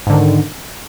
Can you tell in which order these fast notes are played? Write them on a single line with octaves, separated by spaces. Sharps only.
G#2 D3 D#3